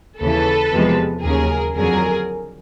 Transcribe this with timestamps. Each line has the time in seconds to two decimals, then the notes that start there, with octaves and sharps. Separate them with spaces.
0.20 D#2 C#3 E3 A4 B4
0.72 E2 C3 F3 G#3
1.23 D#2 C#3 F#3 G#4 A#4
1.76 F2 D3 F#3 G#4 A#4